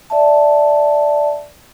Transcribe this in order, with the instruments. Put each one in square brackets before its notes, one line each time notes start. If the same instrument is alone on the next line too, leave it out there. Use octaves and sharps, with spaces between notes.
[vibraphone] D5 E5 A5